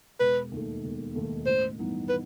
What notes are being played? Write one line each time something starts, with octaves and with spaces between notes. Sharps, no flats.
E1 B4
D#2 D#3 A3
E1
D#2 D#3 A3
A1 C5
G2 E3 B3 D#4
B4